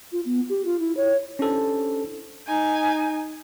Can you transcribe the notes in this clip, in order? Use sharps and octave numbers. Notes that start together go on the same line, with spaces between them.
F4
B3
G4
F4
E4
C#5
C#4 D4 E4 G4 A4 C5
D#4 G#5